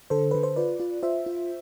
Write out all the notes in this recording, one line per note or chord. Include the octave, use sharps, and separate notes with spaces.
D3 A4 C5
D3 B4
C5
F4 B4 D5
F4
F4 C5 E5
F4